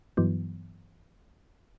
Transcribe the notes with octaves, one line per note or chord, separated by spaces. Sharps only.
G2 E3 F#3 B3